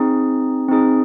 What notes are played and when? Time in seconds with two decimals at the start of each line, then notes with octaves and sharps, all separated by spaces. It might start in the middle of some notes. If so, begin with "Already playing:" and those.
Already playing: C4 D#4 G#4
0.69 C4 D#4 G#4